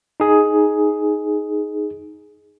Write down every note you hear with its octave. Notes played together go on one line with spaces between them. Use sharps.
D#4 G#4